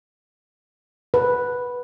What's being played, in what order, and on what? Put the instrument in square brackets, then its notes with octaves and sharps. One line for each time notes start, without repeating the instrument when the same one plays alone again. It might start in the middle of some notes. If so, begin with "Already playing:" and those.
[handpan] B4